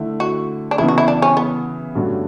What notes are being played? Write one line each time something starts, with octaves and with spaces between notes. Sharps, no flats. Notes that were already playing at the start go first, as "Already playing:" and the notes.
Already playing: D3 A3 E4
F#4
D4
C#3 E3 B3 E4
F#4
E4
D4
C#4
B3
G2 D3 A3 C#4 F#4